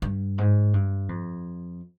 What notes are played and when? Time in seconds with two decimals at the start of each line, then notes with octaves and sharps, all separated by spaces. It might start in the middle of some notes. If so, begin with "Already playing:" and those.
0.02 G2
0.38 G#2
0.74 G2
1.09 F2